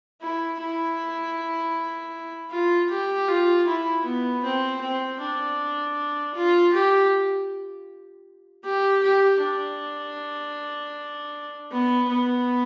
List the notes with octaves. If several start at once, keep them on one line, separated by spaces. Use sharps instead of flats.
E4
E4
F4
G4
F4
E4
B3
C4
C4
D4
F4
G4
G4
G4
D4
B3
B3